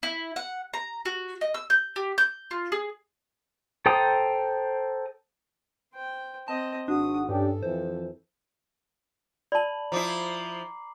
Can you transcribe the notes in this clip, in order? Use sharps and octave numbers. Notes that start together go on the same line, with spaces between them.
E4
F#5
A#5
F#4
D#5
E6
G6
G4
G6
F4
G#4
A4 C5 G5 A#5 D#6
C5 G5
C4 D#5 A5
G#1 D4 F#4 D#6
G2 C#4 D4 G4 A4
F2 E3 C5
D5 A5 B5 F#7
F3 E4 A#5 D6 C7